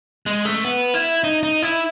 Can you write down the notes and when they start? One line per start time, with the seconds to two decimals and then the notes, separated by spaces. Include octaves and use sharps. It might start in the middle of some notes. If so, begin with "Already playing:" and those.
0.26 G#3
0.45 A3
0.65 B3
0.94 E4
1.24 D#4
1.43 D#4
1.62 E4